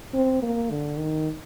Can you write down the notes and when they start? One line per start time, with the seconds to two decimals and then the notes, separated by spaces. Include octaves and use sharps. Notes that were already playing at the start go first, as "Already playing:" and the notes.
0.14 C4
0.42 A#3
0.71 D3
0.98 D#3